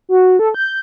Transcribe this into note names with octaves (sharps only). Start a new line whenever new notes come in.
F#4
A4
G6